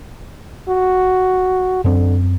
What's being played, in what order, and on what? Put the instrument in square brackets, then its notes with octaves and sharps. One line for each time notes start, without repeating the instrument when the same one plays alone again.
[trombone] F#4
[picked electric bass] F#2 C4 [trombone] D3